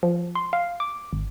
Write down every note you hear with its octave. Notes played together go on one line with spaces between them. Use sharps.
F3
C6
F5
D6
G#1